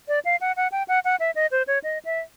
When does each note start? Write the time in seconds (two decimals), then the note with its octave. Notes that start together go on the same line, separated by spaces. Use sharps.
0.08 D5
0.25 F5
0.41 F#5
0.57 F#5
0.72 G5
0.88 F#5
1.05 F#5
1.20 E5
1.35 D#5
1.51 C5
1.67 C#5
1.84 D#5
2.05 E5